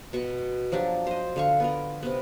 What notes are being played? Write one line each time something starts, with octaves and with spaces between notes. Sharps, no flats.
B2 C#6
F3 F#3 D4 G4
C5 D#5
D3 F5 C#6
B3 F4 A#4
C3 B3